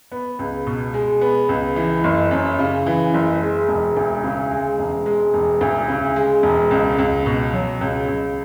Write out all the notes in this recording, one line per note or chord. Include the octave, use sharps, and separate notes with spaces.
B3
C#2
B2
G#3
B3
C#2
E3
F#1
F#2
C#3
E3
F#1
G#3
E1
D2
C#3
G#3
E1
G#3
E1
D2
C#3
G#3
E1
C#2
C#2
B2
F#3
C#2
C#2